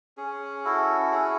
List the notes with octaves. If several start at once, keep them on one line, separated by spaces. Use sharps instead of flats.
C#4 G#4
E4 F#4 A4
C#4 G#4